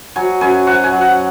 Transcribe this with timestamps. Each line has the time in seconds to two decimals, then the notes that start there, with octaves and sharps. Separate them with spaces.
0.16 F#3 G#5
0.41 F#2 G#5
0.67 F#3 F#5
0.84 G#5
0.93 F#3
1.01 F#5